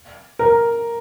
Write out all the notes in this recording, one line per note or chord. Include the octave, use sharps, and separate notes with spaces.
A#4